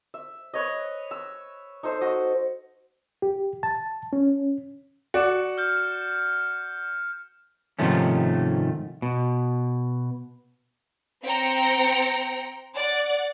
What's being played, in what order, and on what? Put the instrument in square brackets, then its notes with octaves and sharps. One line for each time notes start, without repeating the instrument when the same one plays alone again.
[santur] E5
B4 C#5 D#5
E6
D#4 A4 C5 E5
F#4 D#5
[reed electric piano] G4
A5
C#4
[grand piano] F#4 D5 [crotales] C#7 E7
[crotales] F6 G6
[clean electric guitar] G#2 C3 D#3 F3 A3 C#4
B2
[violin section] C4 G5 A#5 C#7
D5 F#5